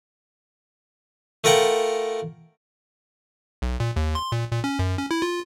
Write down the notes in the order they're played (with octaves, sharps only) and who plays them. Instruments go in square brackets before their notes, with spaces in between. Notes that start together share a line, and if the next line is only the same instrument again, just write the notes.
[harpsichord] A3 F4 A#4 F#5 G5
[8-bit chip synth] B1
A#2
D#2
C6
A#2
A#2
C#4
F#2
C#4
E4
F4